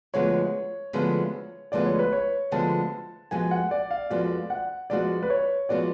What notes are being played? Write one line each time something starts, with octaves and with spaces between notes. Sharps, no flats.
D2 D3 F3 G#3 B3 C#5
D2 D3 F3 G#3 B3
D2 D3 F3 G#3 B3 D5
C#5
B4
C#5
D2 D3 F3 G#3 B3 A5
F2 F3 G#3 B3 F#4 G#5
F#5
D5
F5
F2 F3 G#3 B3 F#4 D5
F#5
F2 F3 G#3 B3 F#4 D5
B4
C#5
F3 G#3 B3 F#4 D5